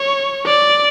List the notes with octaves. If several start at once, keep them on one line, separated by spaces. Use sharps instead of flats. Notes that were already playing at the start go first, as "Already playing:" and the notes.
Already playing: C#5
D5